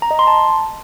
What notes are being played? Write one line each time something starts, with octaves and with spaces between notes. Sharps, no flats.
A#5
D#5
C6
A5